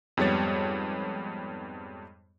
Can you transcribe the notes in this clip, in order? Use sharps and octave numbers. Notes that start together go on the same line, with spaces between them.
F2 G#2 G3 B3 C#5 A6